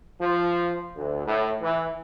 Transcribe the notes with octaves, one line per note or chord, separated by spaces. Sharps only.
F3
D2
A2
E3